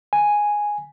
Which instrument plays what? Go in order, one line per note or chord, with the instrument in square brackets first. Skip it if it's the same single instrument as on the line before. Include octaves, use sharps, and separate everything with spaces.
[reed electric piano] G#5